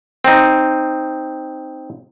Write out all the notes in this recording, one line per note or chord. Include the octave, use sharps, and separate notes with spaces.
C4 D#4